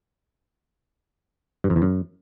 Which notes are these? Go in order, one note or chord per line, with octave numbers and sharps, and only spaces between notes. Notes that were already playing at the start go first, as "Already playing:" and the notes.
G2
F2
E2
F#2